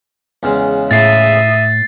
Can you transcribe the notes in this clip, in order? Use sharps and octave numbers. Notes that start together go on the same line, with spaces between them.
E2 C#3 G#3
A2 E5 D#6 A6 C7